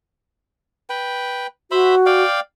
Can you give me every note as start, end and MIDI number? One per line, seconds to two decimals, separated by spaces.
0.90 1.47 71
0.90 1.47 79
1.71 2.23 66
1.71 1.95 72
1.71 1.95 76
1.71 1.95 83
2.06 2.40 74
2.06 2.40 77
2.06 2.40 79